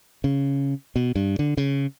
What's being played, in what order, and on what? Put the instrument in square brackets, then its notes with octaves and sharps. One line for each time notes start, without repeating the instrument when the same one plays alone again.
[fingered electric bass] C#3
B2
G2
D3
C#3